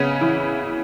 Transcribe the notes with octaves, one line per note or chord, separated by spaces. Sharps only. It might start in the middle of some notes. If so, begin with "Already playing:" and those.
Already playing: C#3 B3 C#4
E3 E4